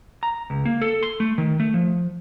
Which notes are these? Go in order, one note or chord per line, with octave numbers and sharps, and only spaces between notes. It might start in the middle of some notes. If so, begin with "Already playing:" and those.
A#5
C#2
A#3
A4
C6
A3
D#3
A3
F3